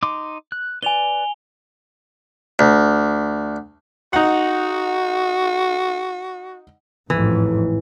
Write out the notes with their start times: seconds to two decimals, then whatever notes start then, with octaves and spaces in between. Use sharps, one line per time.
0.03 D#4 C6 D6
0.52 F#6
0.83 B4 D5 G#5 F7 G7
2.59 D2
4.13 D#4 F#4 F#5
7.10 A1 F2 G#2 E3